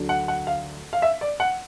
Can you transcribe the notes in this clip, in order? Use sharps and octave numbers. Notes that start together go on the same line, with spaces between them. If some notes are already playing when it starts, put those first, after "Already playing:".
Already playing: D2 D3 F#3
F#5
F#5
F5
F5
E5
D5
F#5